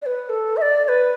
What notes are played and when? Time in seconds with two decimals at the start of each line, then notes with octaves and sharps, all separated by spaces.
0.02 D5
0.06 B4
0.29 A4
0.57 E5
0.62 D5
0.84 D5
0.88 B4